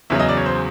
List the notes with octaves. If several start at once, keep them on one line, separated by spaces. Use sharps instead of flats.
E2 C#3 F#3 E5
D#5
D5
C#5
C5